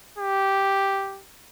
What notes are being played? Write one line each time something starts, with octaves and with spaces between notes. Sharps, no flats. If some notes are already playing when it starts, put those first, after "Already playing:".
G4